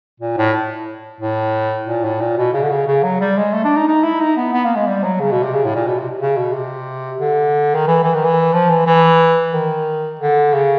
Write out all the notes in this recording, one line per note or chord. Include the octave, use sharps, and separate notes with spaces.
A#2
A2
A2
A#2
A2
A#2
B2
C#3
D3
C#3
C#3
F#3
G3
G#3
A3
D4
D#4
D#4
E4
D#4
B3
B3
A#3
G#3
G3
F#3
C#3
B2
C3
C#3
A2
A#2
B2
C3
C#3
B2
C3
D3
D#3
E3
E3
D#3
E3
F3
E3
E3
D#3
D3
C#3